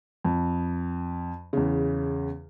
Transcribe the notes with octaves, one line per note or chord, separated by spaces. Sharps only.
F2
E2 C#3